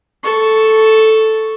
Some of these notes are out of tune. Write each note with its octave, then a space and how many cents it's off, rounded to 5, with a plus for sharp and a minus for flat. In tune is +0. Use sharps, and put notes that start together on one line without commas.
A4 +0 C#6 +0